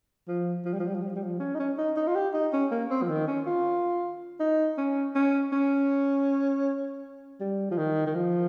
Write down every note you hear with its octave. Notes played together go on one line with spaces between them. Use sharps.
F3
F3
G3
F3
G3
F3
G3
F3
G3
F3
C#4
D#4
C#4
D#4
D#4
F4
G4
D#4
C#4
A#3
C4
F3
D#3
C#4
F4
D#4
C#4
C#4
C#4
G3
F3
D#3
D#3
F3